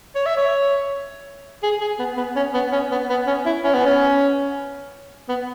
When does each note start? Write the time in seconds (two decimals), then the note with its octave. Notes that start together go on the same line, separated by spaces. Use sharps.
0.15 C#5
0.26 E5
0.37 C#5
1.63 G#4
1.81 G#4
1.99 B3
2.17 B3
2.36 C#4
2.54 B3
2.72 C#4
2.91 B3
3.10 B3
3.27 C#4
3.46 E4
3.64 C#4
3.74 B3
3.86 C#4
5.29 B3